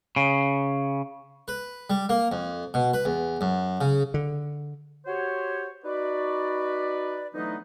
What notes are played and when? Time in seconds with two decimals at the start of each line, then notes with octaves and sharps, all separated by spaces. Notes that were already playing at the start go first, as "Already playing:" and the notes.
0.16 C#3
1.48 B4
1.90 G3
2.09 A#3
2.32 F2
2.74 B2
2.93 B4
3.05 E2
3.41 F#2
3.81 C#3
4.14 D3
5.06 F#4 G4 C5 C#5
5.84 D#4 F#4 B4 D5
7.35 D3 E3 F#3 A3 B3 D#4